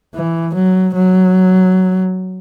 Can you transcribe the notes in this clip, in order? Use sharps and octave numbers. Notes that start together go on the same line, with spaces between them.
E3
F#3
F#3